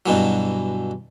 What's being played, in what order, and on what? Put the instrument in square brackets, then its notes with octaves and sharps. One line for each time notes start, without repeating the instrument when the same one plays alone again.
[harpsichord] G2 B2 E3 F#3